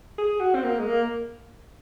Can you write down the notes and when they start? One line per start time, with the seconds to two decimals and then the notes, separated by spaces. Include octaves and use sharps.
0.18 G#4
0.40 F#4
0.55 C4
0.64 A#3
0.79 G#3
0.86 A#3